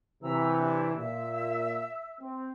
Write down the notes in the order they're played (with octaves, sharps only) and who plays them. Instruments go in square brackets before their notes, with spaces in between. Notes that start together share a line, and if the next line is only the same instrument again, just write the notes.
[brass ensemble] C3 E3 [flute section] E5 A#5 E6
[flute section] D4 E4 G4
[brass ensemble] A#2 [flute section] E5 E6
[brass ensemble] C4